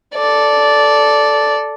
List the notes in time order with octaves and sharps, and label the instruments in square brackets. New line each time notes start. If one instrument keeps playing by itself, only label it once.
[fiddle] A4 D5